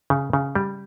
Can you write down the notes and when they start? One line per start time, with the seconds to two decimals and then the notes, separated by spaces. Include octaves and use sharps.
0.10 C#3
0.33 C#3
0.55 G3